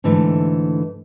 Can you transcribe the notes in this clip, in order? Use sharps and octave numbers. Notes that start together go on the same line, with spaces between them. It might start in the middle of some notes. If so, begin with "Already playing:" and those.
G#2 D3 E3 A3